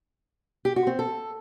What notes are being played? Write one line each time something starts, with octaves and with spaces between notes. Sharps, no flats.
G4
F#4
C4
A4